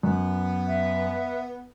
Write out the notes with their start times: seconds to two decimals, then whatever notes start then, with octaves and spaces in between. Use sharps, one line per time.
0.03 F#2 B3
0.66 E5